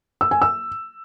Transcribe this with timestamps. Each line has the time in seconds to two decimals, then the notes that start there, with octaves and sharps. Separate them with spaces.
0.21 E6
0.31 G#5
0.42 E6